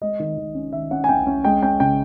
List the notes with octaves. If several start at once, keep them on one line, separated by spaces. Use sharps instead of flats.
G#3 D#5
D#3
D#3
C#4
D#3 E5
C#4 F#5
G#5
C#4 G5
C#4
G#3 G5
C#4 G5
C#3 G5